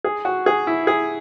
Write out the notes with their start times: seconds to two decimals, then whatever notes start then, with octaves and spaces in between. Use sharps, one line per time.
0.04 G#4
0.25 F#4
0.46 G#4
0.67 E4
0.87 G#4